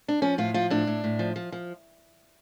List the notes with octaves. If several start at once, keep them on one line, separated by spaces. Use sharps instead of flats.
D4
F3 C#4
A2 F4
F3 F4
A2 D4
A2
A2
F3
F3
F3